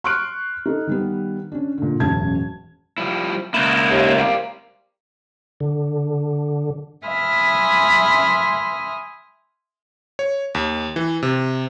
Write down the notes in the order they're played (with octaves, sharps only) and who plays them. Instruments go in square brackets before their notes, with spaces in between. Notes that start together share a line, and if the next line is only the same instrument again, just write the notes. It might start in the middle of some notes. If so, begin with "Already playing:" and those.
[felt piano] C6 C#6 F6 F#6 D7
D#4 A4
D#3 G3 B3
C#4 D4
A#2 D3
E1 A1 F#2 A5 G#6
[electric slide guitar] F3 G3 E4
[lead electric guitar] C#2 E4 [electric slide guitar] A#3
[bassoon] D#2
[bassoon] A#3 [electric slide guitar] G4 C5 D5
[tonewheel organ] D3
[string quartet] E5 G#5 B5 C6 D#6 F6
[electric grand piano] C#5
D#2
E3
C3